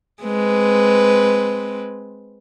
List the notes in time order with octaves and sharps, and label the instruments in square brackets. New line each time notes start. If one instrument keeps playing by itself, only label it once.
[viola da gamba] G#3 C4 B4